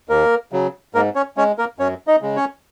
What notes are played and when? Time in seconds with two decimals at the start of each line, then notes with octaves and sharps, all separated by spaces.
0.09 D#2 A#3 A#4
0.52 C#3 F#3
0.95 G#2 A#3 A#4
1.15 C#4 C#5
1.37 G#3 C#4 C#5
1.58 A#3 A#4
1.79 F#2 C#4 C#5
2.07 D#4 D#5
2.22 C#3 G#3
2.37 C#4 C#5